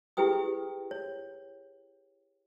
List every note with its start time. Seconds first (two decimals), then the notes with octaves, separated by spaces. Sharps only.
0.17 E4 G4 G#4 B4 G5 D#6
0.91 C#5